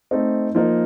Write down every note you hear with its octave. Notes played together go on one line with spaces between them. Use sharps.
A3 C4 D#4
F3 A#3 D#4